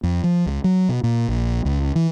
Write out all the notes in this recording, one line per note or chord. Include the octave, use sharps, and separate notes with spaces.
F2
F3
C#2
F#3
B2
A#2
A#1
C#2
E3